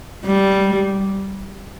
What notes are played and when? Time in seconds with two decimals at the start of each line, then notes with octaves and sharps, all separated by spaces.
0.25 G3